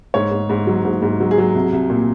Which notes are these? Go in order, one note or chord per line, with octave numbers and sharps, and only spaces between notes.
G#2 C#5
G#2
G#2
F#3
G#2
G#2
F#3
G#4
F#3
C2
C2
A#2